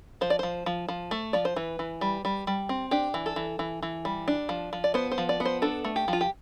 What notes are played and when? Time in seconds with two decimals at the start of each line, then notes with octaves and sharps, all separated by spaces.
0.21 F3 C5
0.30 D5
0.39 F3 C5
0.66 F3
0.88 F3
1.11 A3
1.33 F3 D5
1.45 C5
1.56 E3 B4
1.79 E3
2.01 G3
2.25 G3
2.47 G3
2.69 C4
2.91 D4 G4
3.14 E3
3.26 A4
3.36 E3
3.59 E3
3.82 E3
4.05 G3
4.28 D4
4.49 F3
4.73 F3
4.84 D5
4.94 B3 C5
5.12 C5
5.18 F3
5.29 D5
5.40 B3
5.45 C5
5.62 D4 A4
5.84 A3
5.96 G4
6.08 F3
6.13 F4
6.21 G4